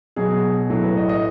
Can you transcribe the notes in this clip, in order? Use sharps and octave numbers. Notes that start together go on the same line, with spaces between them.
B2 F#3 G#4
A2 F#3
B4
D#5
D#5